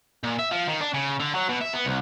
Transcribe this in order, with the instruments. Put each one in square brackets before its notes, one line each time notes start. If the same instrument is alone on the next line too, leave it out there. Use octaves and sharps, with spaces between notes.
[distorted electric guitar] A#2
E5
F3
D#3
D4
C#3
D3
F#3
B2
E5
B3
C2